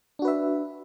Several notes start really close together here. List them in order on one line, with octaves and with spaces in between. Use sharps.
D4 F#4 B4 E5